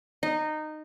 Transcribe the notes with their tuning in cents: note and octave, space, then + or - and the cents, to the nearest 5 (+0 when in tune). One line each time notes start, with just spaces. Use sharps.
D#4 -15